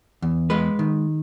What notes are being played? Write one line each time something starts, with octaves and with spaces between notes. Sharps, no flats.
E2
G#3 B4
D#3